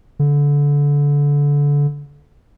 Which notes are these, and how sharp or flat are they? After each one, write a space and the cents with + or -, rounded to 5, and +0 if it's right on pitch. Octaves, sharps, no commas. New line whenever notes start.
D3 -25